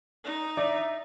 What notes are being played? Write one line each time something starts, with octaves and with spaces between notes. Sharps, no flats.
D#4
D5 E5